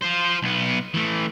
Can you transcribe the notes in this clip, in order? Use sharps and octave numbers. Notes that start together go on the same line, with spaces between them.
F4 C5
B1 B3
E3 A3